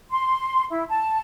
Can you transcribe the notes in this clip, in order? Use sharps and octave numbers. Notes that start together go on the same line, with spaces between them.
C6
E4
A5